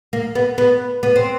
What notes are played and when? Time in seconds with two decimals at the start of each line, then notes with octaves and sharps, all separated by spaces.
0.13 A#3
0.35 B3
0.58 B3
1.03 B3
1.16 C4